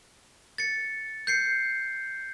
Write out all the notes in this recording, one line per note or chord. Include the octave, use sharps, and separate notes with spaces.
A6 C#7
G6 C7 C#7